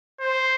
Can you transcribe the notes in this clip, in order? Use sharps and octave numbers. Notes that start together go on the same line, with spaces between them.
C5